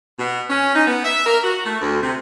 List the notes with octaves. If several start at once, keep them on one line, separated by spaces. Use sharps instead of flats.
B2
C#4
D#4
B3
E5
A#4
F#4
A3
D2
C3